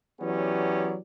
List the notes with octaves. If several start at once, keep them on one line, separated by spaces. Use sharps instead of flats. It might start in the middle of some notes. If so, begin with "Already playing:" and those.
E3 F#3 B3 C#4 G4 D5